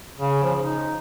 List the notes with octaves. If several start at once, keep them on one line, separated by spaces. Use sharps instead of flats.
C#3
F3
D#4